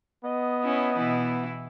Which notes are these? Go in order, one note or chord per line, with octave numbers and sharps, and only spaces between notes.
B3 D#5
C#4 E4
B2 E3 E4